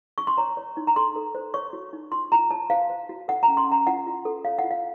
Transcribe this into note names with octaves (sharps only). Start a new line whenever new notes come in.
C#6
C6
C#5 A#5
C#5
D#4
A#5
A4 C6
A4
C5
C#5 C#6
F#4
D#4
F4 C6
F4 A#5
C#5 A5
C5 F5
C5
F#4
A4 F#5
A#5
C#4
C6
C#4 A#5
F4 F#5
F4
A4
C#5 F5
F#5
F4
F5